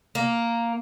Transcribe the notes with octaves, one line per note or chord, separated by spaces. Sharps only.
A#3